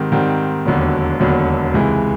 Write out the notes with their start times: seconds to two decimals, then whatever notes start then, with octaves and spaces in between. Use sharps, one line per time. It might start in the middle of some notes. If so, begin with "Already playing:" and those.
Already playing: G#2 D#3 G3 C4
0.12 G#2 D#3 G3 C4
0.65 E1 D#2 D3 F#3 B3
1.20 E1 D#2 D3 F#3 B3
1.74 C#2 C3 E3 G#3